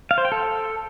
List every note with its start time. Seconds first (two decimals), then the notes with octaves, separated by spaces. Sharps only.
0.11 F5
0.18 C5
0.25 G5
0.32 A4